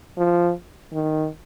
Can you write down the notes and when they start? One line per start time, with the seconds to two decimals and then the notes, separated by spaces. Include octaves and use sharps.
0.18 F3
0.93 D#3